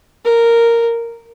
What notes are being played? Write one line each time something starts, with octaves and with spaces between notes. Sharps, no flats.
A#4